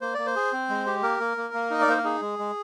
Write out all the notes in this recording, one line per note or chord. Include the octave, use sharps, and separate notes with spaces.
A#3 C5
A#3 D5
C5
G#4
C4
G#3
G4
A#3 A#4
A#3
A#3
A#3
D#4 D#5
D5
A#3 C5
A#4
D#4 G#4
G#3
G#3